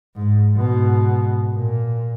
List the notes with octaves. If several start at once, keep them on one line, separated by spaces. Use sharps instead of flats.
G#2
G#2 B2
A#2